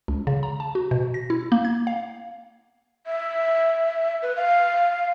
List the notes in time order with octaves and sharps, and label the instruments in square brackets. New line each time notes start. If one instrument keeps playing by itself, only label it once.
[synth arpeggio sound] C#2
C#3
A#5
A5
F#4
B2
A#6
E4
A#3
G#6
F5
[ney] E5
B4
F5